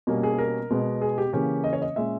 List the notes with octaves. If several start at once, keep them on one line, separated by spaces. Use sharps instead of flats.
B2 G3 A#3 C#4
G#4
A#4
B2 G#3 B3
G#4
G4
C#3 E3 A#3 C#4 G4
D#5
C#5
D#5
A#2 G#3 C#4 E5